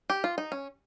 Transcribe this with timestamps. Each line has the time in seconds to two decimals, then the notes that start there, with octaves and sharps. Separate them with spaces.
0.10 G4
0.24 F4
0.38 D#4
0.52 C#4